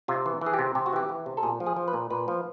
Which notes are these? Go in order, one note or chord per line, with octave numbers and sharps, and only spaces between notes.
C3 F4
E3
E3 G#4
G4
C3
C3 G4
F#4
E3 G4
E3
C3
A4
A#2 G#4
F3
G#4
F3
B4
A#2
A#2 B4
F3